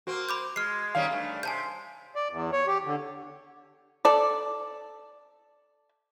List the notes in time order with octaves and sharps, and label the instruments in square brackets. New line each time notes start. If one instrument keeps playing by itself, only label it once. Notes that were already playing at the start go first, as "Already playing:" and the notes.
[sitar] A#3 C4 [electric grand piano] F#4
[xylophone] B5 D6 G6
[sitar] G#3 [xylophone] F6 C7
[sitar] D#3 G3 C#4 [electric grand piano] F5
[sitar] G2 A3
[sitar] C3 [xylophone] G#5 A5 G6
[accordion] D5
E2
C#5
G4
D3
[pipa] A4 D5